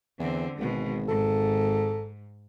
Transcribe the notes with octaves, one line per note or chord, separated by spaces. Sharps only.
E2 D3 C4
G#1 B2 G#3
G#2 A4